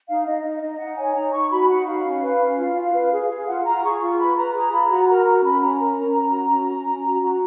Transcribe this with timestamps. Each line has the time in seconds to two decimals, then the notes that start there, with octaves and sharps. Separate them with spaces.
0.08 D#4 F5
0.26 D#4 D#5
0.43 D#4 D#5
0.61 D#4 D#5
0.79 D#4 F#5
0.97 C#5 G#5
1.15 D#4 A#5
1.33 D#4 C#6
1.51 F#4 B5
1.69 D#4 F#5
1.87 F#4 F5
2.05 C#4
2.22 B4
2.40 C#4
2.57 F4
2.75 F4
2.93 B4
3.11 G#4
3.29 G#4
3.46 F4 F#5
3.64 F4 A#5
3.83 G#4 C#6
4.00 F4 C#6
4.18 B4 B5
4.36 B4 A#5
4.53 G#4 A#5
4.71 F4 B5
4.89 F#4 A#5
5.07 A#4 A#5
5.25 F#4 A#5
5.38 A#5
5.43 C#4 B5
5.60 C#4 A#5
5.79 A#4
5.97 C#4
6.14 C#4
6.32 F#4
6.50 C#4
6.68 C#4
6.86 C#4
7.04 F#4
7.21 F#4